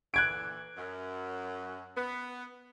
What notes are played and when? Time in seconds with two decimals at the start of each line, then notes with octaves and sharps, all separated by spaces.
0.14 A#2 D3 E3 F#6 G#6 D7
0.76 F#2
1.97 B3